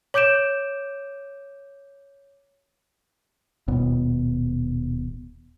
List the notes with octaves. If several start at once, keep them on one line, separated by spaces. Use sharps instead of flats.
C#5 D6 G6 D7 E7
D#1 B2